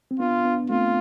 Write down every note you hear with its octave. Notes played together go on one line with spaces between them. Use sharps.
C4
B3 D4 F4
B3 D4
A3 C4 F4